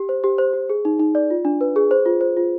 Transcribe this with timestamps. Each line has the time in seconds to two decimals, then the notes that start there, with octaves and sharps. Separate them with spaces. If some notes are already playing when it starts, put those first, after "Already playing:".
Already playing: G4
0.09 C5
0.24 G4
0.38 C5
0.53 G4
0.69 G#4
0.85 D#4
1.00 D#4
1.15 D5
1.30 F4
1.45 D4
1.61 B4
1.76 G#4
1.91 C5
2.06 F4
2.21 C5
2.37 F4